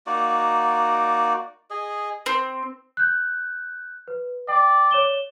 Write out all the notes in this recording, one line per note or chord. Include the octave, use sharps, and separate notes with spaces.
A#3 D#4 F#4 D5
G#4 D#5
C4
F#6 G6
B4
D5 G5
C#5 E7 G7